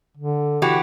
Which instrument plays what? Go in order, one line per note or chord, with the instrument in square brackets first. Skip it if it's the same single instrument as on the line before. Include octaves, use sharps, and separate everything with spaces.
[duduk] D3
[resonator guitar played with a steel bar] E3 F#4 G4